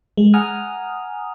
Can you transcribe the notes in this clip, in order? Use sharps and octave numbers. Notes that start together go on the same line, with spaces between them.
G#3
F#5 G#5 A#5 D#6 F6